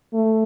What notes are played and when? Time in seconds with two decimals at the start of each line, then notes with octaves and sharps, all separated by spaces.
0.15 A3